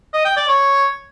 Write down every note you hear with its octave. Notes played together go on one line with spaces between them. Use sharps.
D#5
G5
D5
C#5